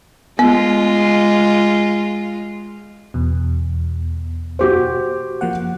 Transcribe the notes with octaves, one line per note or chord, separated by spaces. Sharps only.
G#3 B3 F4
E2 B2
F#4 G4 C5
F3 A#3 F#5